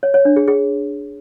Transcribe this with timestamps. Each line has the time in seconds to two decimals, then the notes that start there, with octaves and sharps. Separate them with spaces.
0.03 C#5
0.14 C#5
0.25 D4
0.36 G#4
0.48 G#4